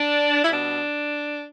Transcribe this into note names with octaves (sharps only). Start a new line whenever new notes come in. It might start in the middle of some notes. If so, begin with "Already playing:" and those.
Already playing: D4
E4
B2 G3 D4